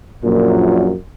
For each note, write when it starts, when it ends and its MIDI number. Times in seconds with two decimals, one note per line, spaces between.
0.24 0.93 34
0.24 0.93 42
0.24 0.93 46